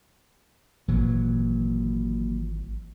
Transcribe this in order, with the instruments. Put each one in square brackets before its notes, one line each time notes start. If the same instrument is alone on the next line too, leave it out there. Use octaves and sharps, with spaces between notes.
[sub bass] G#1 [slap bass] A#2 E3 F#3